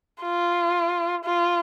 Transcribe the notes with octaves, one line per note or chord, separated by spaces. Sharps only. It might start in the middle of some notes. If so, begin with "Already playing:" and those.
F4
F4